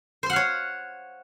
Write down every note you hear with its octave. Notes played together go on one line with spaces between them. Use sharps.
C5 C#5 F5 F#5 C6